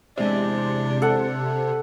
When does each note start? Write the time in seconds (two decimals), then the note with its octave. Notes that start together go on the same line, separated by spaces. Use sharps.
0.17 E2 C3 G#3 D4
1.02 A4 F#5